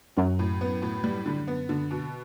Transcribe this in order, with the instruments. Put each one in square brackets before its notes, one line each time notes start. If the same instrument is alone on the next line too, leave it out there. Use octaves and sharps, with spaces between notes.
[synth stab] F#2 [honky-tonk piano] F#3
[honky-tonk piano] A2
B3
A2
G3
D3
B3
D3
B2